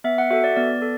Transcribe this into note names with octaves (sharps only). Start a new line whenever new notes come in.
B3 E5
F#5
F#4 A4 E5
D5
B3 D5
A4